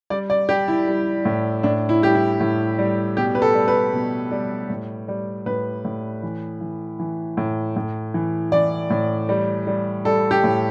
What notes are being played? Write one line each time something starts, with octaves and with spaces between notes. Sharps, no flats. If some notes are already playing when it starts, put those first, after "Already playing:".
G3 D5
D5
G3 G4
E4
G3
A2
A2 D4
E4
G3 G4
E4
A2
G3
B2 G4
B4
A4
G3
B4
B2
G3
A2
G3
A2 B4
A2
E3
E3
E3
A2
A2
E3
E3 D5
A2
G3
G3
G3 A4
G4
A2